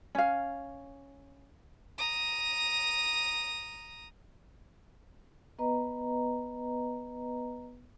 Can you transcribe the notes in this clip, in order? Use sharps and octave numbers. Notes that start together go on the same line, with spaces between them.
C#4 F5
A#5 D#6
B3 B4 D#5 A#5